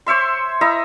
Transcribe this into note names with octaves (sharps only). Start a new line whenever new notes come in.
C5 C#5 E5 C6
E4 D#5 E5 A#5